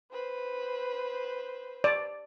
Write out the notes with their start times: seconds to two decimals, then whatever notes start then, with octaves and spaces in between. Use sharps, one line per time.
0.12 B4 C5
1.84 D5